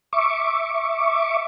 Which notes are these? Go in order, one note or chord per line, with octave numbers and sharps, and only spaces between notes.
E5 C#6 D6